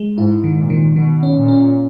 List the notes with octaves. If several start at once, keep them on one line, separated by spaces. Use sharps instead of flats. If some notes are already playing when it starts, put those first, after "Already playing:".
Already playing: G#3
G#2 E4
D#3
A#2
D#3
B2 D#3
C#4
A#2
C#4